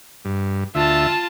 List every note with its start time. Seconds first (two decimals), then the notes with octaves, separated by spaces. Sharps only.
0.25 G2
0.75 D2 F4 E5 A5